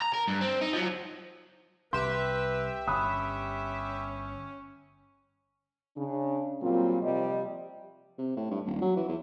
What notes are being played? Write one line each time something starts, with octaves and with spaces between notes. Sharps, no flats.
A#5
A#4
G2
C4
D#4
F3 F#3
C2 G4 B4 E5 C6
G1 C#4 B5 D#6 F#6
C#3 D4
A#2 F#3 G3 A#3 C4 F4
C3 F3 G3 D#5
C3
A2
G2
D#1
F#3
E3
E2